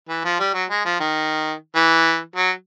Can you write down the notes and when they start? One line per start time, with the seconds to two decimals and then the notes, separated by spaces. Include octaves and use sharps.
0.09 E3
0.24 F3
0.39 G3
0.54 F#3
0.70 G#3
0.85 F3
1.00 D#3
1.75 E3
2.36 F#3